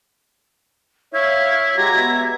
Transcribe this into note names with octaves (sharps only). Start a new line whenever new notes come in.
E4 C#5 E5 F5 G#6
G#3 F#4 G4 A#5
B3 E5